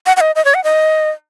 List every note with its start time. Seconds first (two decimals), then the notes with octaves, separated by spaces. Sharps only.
0.06 F#5
0.17 F#5
0.21 D#5
0.36 D#5
0.45 C#5
0.54 F#5
0.64 D#5